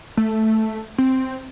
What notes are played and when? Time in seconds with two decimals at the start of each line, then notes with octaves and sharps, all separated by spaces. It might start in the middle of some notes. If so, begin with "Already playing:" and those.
0.17 A3
0.98 C4